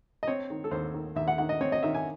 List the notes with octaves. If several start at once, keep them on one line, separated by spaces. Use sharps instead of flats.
D#5
C4 C#5
D#3
A4
D#2 C5
D#3
D#2 E5
F#5
D#3 F#5
D#5
C4 C#5
D#5
D#3 E5
G#5